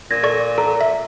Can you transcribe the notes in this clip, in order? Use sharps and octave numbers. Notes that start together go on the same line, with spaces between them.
A#2 G#6 A#6
A4 D5 C#6
A4 A#5
E5